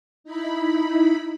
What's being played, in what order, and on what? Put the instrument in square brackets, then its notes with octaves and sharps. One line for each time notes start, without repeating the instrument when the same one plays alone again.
[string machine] D#4 E4 B5